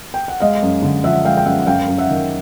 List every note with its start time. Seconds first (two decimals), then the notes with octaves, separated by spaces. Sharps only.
0.14 G5
0.28 F#5
0.40 G#3 D#5 F5
0.63 F#2
0.82 D3
1.04 F3 E5 F#5
1.25 G#3 F5 G5
1.37 G5
1.46 F#2 E5 F#5
1.59 F#5
1.66 F#2 F5 G5
1.88 F#2
1.98 E5 F#5
2.09 D#3